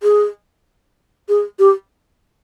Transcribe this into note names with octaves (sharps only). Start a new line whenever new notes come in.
G#4
G#4
G4